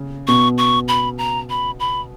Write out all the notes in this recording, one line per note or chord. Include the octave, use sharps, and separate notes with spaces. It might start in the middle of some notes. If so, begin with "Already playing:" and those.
Already playing: C#3
B2 C#6
C#6
B5
A#5
B5
B5